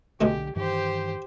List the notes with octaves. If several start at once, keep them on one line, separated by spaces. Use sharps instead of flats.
B1 B2 D3 G#3 A3 G4
G2 D#3 E3 G4 C5